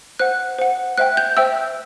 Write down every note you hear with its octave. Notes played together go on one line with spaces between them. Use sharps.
C5 F#5 F#6
C5 F#5
C5 E5 G5 F#6
G6
C5 E5 G5 E6